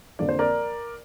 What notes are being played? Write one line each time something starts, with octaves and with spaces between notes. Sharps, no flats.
F2 D3 F3 A#3 D5
C5
A#4 D5